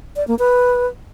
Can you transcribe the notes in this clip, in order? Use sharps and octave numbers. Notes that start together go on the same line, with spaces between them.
D5
A#3
B4